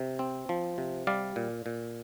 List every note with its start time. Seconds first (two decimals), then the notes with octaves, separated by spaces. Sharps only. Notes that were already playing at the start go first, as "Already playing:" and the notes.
Already playing: C3
0.19 C4
0.49 F3
0.78 C3
1.07 G3 D5 F5
1.36 A#2
1.66 A#2